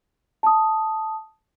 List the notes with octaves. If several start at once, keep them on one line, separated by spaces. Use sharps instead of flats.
A5 D#6